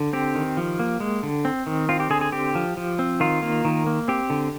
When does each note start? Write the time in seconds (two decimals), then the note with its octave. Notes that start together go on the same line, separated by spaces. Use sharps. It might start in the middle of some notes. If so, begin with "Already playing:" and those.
Already playing: D3
0.13 C4 G4
0.35 D#3
0.57 F3
0.79 A#3
1.00 G#3
1.23 D3
1.45 C4
1.67 D#3
1.89 C4 F4
2.00 G4
2.10 D3 G#4
2.21 G#4
2.32 C4 G4
2.55 F3
2.77 F3
2.99 C4
3.20 D#3 F4
3.42 A#3
3.65 D#3
3.87 A#3
4.08 C4 G4
4.30 D3